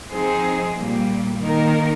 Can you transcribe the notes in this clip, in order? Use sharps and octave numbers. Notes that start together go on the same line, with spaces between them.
F3 C4 D#4 G#4
A#2 G3 A#3
D#3 A#3 D#4 A#4